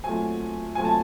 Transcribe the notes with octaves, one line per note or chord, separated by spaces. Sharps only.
A#2 F#3 A3 C4 G#5
A#2 F#3 A3 C4 G#5
A5